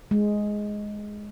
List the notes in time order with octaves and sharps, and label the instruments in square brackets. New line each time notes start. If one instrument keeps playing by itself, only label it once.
[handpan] G#3